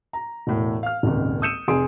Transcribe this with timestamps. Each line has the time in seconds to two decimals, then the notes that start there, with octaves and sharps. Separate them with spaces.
0.13 A#5
0.47 E1 A2
0.83 F5 F6
1.03 D#1 G#1 C#2
1.42 D#6 E6 G6 C#7 D#7 E7
1.68 F1 G#4 C6 D#6 D7